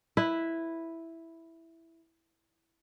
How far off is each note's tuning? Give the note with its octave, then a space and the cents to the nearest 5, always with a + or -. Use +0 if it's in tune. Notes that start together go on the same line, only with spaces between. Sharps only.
E4 +0 B4 +0